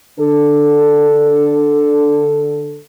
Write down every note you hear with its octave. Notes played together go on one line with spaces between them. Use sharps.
D3 D4 A4